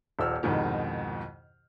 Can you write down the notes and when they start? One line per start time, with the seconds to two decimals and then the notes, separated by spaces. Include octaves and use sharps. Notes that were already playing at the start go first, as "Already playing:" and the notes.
0.19 D#1 A#1 E6 F6
0.43 C2 F2 G#2 B2 D#3